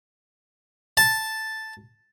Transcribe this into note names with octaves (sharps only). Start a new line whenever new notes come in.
A5